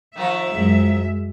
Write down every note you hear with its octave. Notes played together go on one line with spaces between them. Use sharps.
D#3 F3 A#4 E5
F#2 G#3